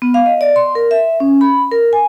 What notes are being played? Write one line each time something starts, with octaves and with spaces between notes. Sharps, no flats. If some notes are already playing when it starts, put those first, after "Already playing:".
B3
F5
D#5
D5
C6
A#4
E5
C#4
B5
A#4
G#5